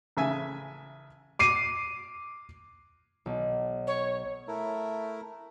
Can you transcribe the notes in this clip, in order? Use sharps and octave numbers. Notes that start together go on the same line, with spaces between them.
A1 C#3 E5 G#5
D6 C7 D#7
B1
C#5
A3 E4 A#4